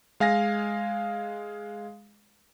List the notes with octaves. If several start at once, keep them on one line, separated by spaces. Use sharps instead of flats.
G#3 F5 G#5 A#6